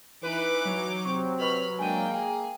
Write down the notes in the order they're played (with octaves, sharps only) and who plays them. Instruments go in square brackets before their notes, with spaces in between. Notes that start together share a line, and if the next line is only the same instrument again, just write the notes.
[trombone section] E3 [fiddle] D#4 D6 [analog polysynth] B4
[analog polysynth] F#3
[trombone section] C3 C4 [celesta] C#6
[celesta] B4 D#5 C#6 [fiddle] B5 F6
[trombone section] G#3 A#3 [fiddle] D4 G5 [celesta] G#5 D#7
[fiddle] G#4 [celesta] G5 G#5